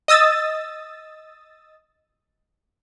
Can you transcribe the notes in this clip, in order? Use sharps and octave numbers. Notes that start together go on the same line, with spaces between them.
D#5 D#6 E6 A6